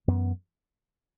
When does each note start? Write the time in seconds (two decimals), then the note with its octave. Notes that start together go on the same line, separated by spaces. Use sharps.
0.08 F#2 E3 B3